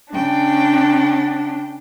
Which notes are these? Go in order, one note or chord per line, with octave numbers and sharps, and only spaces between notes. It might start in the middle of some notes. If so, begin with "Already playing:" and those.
C#3 D4 G5